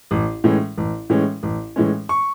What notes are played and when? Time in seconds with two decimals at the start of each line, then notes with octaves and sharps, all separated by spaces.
0.11 A1
0.44 A2 E3 G#3 C#4
0.78 A1
1.10 A2 E3 G#3 C#4
1.43 A1
1.76 A2 E3 G#3 C#4
2.09 C#6